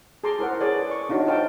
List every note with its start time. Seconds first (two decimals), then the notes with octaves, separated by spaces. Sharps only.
0.24 G#4 A5 A#5 C6 D6
0.39 E4 A#4 C5 F#5
0.60 G#4 B4 C#5 D5 A5
0.91 C#6
1.09 D4 D#4 F4 F#4 C#5
1.27 F4 C5 F5 G5 A5